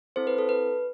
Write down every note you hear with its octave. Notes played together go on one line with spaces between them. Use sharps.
C4 E4 A4 C5
B4
A4
B4